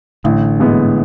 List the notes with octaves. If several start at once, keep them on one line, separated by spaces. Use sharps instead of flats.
A1 D3
G#2 E3 G#3 B3